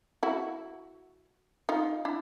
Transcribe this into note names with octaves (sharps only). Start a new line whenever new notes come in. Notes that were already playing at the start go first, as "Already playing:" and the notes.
E4 F#4
D#4 F4
D4 E4